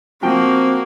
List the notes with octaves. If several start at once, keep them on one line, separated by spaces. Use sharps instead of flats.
F3 A#3 C4 F#4 G5